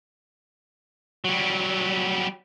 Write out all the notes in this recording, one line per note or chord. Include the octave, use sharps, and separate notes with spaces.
F#3 G3